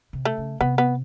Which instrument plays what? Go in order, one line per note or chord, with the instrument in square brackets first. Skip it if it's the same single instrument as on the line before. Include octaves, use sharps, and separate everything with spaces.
[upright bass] C3
[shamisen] A3
[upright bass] C#3
[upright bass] C3 [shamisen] B3
[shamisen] B3